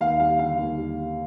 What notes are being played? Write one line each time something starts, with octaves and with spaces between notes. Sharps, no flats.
D#2 F5
G3 F5
D3 F5
D#2
G3
G3